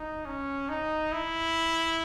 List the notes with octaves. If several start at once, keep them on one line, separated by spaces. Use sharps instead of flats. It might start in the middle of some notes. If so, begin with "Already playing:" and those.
Already playing: D#4
C#4
D#4
E4